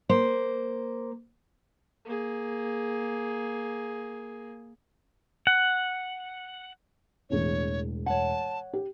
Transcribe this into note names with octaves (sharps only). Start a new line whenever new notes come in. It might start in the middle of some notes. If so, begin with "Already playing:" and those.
A#3 C5
A#3 G#4
F#5
E1 E2 A2 C#5
C#5 F#5 A5
G4